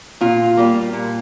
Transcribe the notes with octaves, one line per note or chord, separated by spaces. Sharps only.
A#2 F4
G3 A#3
A#2